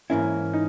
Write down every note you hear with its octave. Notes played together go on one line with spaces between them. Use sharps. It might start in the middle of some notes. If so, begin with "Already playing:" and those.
G#2 E3 A#3 C#4 E4
D#4